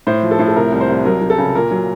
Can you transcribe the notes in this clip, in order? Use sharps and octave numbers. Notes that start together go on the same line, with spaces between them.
A2 C5
F3
A4
A2
A4
C3 A#4
C2
C5
C2
F#3 A#4
F#3
A4
C#3
A#2 A#4
F#3